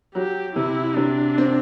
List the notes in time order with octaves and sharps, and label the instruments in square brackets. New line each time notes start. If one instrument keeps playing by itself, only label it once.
[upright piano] F#3 [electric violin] G4
[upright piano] C3 [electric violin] E4
[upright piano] C3 [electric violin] D4
[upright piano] C4